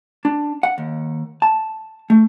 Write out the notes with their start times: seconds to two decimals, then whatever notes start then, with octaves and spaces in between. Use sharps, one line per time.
0.25 D4
0.63 F#5
0.78 D#2
1.42 A5
2.10 A3